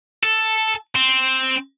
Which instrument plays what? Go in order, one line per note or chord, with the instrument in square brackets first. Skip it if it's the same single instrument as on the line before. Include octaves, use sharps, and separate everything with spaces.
[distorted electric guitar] A4
C4